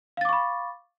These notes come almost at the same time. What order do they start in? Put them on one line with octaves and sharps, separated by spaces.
F5 A6 D6 C#6 B5